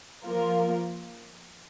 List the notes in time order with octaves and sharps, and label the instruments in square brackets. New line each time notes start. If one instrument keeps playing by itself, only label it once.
[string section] F3 A#3 F4 A#4